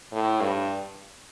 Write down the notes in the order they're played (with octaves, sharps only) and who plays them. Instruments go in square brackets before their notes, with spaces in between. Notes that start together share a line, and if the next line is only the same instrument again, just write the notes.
[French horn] A2
G2